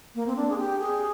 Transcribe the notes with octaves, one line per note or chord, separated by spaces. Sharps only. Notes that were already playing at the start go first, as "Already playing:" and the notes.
A#3
C4
D4
G#4
G4
G#4